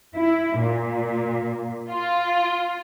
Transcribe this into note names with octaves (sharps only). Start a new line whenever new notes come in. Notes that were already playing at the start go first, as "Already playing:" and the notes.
E4
A#2
F4